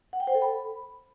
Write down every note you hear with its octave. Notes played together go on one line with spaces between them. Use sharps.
F#5
G5
C5
A4
B5